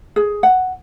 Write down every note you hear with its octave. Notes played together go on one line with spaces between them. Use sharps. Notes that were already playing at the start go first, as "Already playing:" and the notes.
G#4
F#5